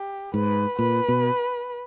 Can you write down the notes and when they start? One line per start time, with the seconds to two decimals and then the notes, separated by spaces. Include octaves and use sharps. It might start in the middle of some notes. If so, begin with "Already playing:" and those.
Already playing: G4
0.34 G#2 B4
0.79 A#2 B4
1.08 B2